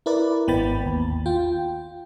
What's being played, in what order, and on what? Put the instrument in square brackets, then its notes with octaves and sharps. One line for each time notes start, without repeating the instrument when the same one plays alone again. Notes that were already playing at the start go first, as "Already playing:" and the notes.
[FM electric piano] E4 A#4 B4 D5
G#1 B3 G5 B5 A6
D#2
F4 G5